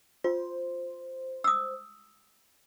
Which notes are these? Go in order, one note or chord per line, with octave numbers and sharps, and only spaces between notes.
F4 C5
D#6 E6